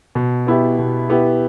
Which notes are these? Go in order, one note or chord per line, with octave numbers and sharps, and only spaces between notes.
B2
B3 E4 G4
B2
B3 E4 G4